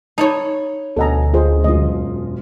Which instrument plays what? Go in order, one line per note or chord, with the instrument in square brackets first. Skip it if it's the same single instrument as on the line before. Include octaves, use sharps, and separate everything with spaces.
[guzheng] D#4 E4 C#5 [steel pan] A5
[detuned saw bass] D2 [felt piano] B2 F#5 G#5 [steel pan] A4 D#5 A#5
[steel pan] F4 G#4 C5 [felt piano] D#5
[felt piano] E1 F#2 F4 [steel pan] D#5